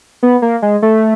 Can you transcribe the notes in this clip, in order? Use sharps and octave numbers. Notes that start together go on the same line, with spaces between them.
B3
A#3
G#3
A3